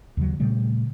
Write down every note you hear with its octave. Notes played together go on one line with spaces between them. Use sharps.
D#2 C#3 F#3
A#2 C#3 G3 A3